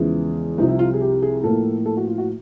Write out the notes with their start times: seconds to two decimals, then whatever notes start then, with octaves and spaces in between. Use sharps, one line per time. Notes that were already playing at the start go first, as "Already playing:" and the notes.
Already playing: E2 C#3 F3 G#3 B3 E4
0.58 C2 C3 F3 D#4
0.68 E4
0.79 F4
0.94 G#4
1.01 G4
1.22 G#4
1.43 A2 F3 A#3 A4
1.86 A4
1.97 F#4
2.08 F4
2.18 F#4